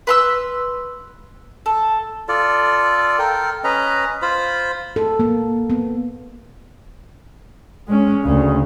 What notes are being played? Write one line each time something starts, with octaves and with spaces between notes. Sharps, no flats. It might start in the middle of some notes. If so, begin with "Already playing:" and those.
B4 C6 E6
A4
F4 A4 D5
A4 A#4 G5
C#4 B4 D#5 A#5
F4 C5 B5
A4
A#3
B3
G#3 C#4
D2 C#3